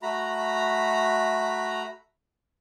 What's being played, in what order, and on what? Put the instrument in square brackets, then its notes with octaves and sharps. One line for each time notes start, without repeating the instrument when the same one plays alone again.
[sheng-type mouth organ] A3 F#4 A#5 B5